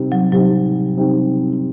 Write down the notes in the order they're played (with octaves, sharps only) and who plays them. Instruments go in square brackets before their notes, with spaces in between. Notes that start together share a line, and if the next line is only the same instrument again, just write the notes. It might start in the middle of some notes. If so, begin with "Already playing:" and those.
Already playing: [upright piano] C3 G3 C4 D#4
[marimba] F#3
[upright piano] C3 G3 C4 D#4 [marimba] F#3
[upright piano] C3 G3 C4 D#4